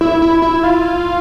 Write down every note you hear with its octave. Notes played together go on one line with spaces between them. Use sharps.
E4
E4
E4
F4